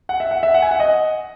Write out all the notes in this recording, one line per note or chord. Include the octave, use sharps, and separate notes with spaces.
F#5
E5
F#5
E5
F#5
G#5
F#5
D#5